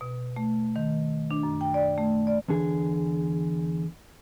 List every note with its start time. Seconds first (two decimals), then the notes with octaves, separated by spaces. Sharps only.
0.01 B2
0.36 A3
0.76 D#3
1.31 D4
1.43 F#2
1.61 G5
1.74 D5
1.98 A3
2.27 D5
2.48 E2 D3 G#4